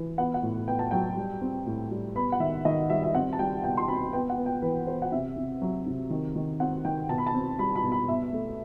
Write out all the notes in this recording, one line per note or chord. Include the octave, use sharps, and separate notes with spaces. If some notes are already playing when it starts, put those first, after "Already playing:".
Already playing: E3
B3 F#5
F#5
A2
B3 G5
A5
F#3 G5
G3
C4
A2
G3
B3 B5
F#5
D#3 E5
D#3 D#5
G3 E5
E5
C4 F#5
A5
G3 G5
B2 G5
C6
C4 B5
B3 G5
F#5
B3
G5
E3 B4
B3 C5
F#5
C3 E5
C3
F#3
C3
D#3
D#3
C4 F#5
D#3 G5
B2 A5
B5
A5
C4
G3 B5
B5
B2
B5
B2 E5
A3